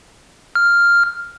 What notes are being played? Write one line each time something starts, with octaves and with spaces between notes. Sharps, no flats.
F6